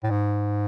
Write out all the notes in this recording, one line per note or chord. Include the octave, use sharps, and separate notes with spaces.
A2
G#2